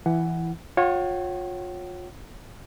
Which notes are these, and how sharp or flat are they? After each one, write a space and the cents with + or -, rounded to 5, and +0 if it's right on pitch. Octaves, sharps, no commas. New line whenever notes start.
E3 +15 E4 +0 F#5 +10
F4 +35 C#5 -15 G5 -45